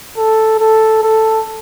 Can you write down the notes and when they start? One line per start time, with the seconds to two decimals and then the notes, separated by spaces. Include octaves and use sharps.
0.17 A4
0.60 A4
1.03 A4